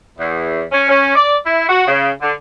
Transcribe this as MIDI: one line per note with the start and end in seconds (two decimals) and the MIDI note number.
0.19 0.62 40
0.71 0.88 61
0.89 1.14 61
1.15 1.36 74
1.46 1.65 64
1.68 1.85 66
1.87 2.08 49
2.21 2.32 50